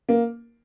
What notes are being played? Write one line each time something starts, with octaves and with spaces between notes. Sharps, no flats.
A#3